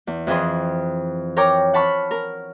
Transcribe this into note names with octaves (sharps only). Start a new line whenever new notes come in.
E2
F2 E3 G#4 C6
A#4 C#5 G5 A#5 D6
F#5 A5 B5 C#6 F6
A#4